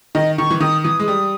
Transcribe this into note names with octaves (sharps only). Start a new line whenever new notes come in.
D#3 D#5
D#3 C#6
E3
D#3 D#6
E3 D#6
G#3
G3